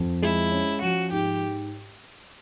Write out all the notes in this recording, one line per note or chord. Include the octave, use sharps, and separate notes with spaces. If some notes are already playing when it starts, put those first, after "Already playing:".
Already playing: F2
G#3 E4
C#4
F3 F#4
G#2 G4